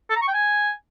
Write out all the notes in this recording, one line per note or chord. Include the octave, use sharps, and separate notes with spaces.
A4
A#5
C#6
G5
G#5